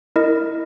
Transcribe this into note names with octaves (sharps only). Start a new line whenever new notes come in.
E4 A#4 D#5